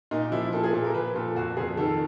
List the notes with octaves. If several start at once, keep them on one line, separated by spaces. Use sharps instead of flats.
A#2 D#4
F3 E4
A#2 A4
G#4
A#2 A4
A#4
F3 B4
A#2 A4
F2 F#4
F2 G#4
D#3 A4